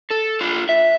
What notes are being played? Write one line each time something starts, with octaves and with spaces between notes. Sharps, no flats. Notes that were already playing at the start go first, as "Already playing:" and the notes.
A4
D4 F4
E5